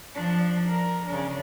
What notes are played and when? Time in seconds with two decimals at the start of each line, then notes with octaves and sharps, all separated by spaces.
0.15 F3 D4
0.68 A#4
1.07 C#3 D4